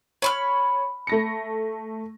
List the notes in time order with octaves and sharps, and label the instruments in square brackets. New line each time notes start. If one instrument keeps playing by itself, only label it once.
[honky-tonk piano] C#5 [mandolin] B5 C6 F6
[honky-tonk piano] A3 A#6 C#7